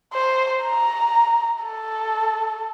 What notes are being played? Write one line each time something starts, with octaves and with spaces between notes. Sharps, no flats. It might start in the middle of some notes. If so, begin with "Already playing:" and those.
C5
A#5
A4